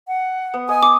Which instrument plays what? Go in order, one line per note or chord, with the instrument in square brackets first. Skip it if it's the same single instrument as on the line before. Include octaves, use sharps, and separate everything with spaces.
[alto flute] F#5
[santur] B3
[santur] D#5 D#6 [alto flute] G#5
[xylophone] D6